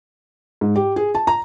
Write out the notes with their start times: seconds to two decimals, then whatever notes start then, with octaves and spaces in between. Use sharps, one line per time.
0.61 G#2
0.76 G4
0.96 G#4
1.15 A5
1.27 A#5